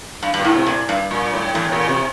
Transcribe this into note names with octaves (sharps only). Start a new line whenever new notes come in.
G2
G2
A#2
A2
C3
A#2
G2
A#2
A2
E2 A2
A#2
C3